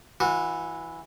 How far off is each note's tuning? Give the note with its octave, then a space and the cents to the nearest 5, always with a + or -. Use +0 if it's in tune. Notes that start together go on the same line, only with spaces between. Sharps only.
E3 +0 F#4 -30